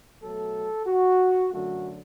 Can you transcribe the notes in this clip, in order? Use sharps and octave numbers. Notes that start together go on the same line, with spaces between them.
B2 F#3 A3 A4
F#4
F#2 D3 F#3 A3 F#4